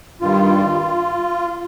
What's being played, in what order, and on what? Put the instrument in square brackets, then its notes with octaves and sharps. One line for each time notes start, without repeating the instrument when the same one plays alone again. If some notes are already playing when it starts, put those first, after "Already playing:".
[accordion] G2 D#3 G3 F4